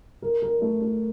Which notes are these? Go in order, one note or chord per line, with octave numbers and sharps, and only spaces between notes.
A#4
A#4
A3
A3